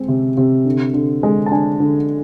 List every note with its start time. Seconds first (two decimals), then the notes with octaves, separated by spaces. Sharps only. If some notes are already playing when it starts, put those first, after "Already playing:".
Already playing: G#3 C4
0.08 C3
0.37 C3
0.65 D3
0.94 D3
1.23 G#3
1.46 A5
1.51 D4 G#5
1.80 D3